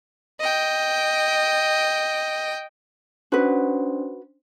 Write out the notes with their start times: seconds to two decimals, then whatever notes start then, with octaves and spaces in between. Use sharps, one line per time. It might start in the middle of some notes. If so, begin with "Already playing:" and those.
0.40 D#5 G5
3.32 C#4 D4 F#4 B4 C5